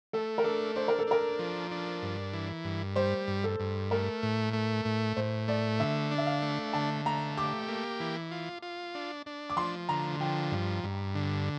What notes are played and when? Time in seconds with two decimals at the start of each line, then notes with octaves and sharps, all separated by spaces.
0.13 A3 A4
0.38 A#4
0.44 D4 A4
0.76 D4 C5
0.88 A#4
0.99 A4
1.07 D4 A#4
1.39 F3
1.71 D4
2.02 G2
2.33 E3
2.64 G2
2.96 G3 C5
3.27 G2
3.44 A4
3.60 G2
3.91 A3 A#4
4.23 A2
4.53 A3
4.85 A2
5.16 A2 C5
5.48 A3 D5
5.80 D3 E5
6.12 D4
6.18 E5
6.26 F5
6.42 A3
6.73 D3 A5
7.06 A3 A#5
7.37 G4 D6
7.68 A#3
8.00 E3
8.31 F4
8.62 F4
8.95 D4
9.26 D4
9.50 D6
9.57 F3 C6
9.89 D3 A#5
10.20 F3 G5
10.52 G2
10.84 G2
11.15 D3